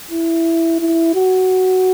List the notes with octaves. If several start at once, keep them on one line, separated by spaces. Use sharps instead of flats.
E4
E4
F#4